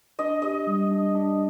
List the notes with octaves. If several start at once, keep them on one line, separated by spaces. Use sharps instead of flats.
D4 D#5
G4 D#5
G3
D4
D4